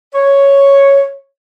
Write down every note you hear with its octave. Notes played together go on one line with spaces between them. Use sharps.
C#5